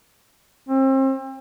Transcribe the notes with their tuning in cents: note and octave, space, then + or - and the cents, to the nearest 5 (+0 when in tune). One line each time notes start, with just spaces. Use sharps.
C4 +35